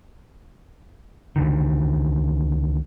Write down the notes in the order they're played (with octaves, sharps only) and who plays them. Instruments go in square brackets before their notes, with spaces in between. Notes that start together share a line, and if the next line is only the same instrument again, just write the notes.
[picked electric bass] C#2 D3 D#3